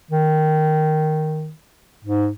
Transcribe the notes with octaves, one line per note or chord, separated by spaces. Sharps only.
D#3
G#2